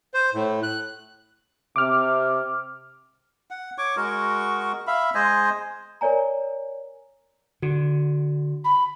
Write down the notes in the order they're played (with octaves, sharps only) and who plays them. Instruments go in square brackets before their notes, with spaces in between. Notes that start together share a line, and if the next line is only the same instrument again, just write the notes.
[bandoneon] C5
A2
F#6
[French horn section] C3 [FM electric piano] D6 F6
[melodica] F#5
C#5 C#6 D6
G#3 F#4 A#4 C#6
E5 F5 B5
G#3 C5 D#5 G#5
[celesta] A#4 C#5 D5 G#5 A#5
[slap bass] D3 [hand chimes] F#4
[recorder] B5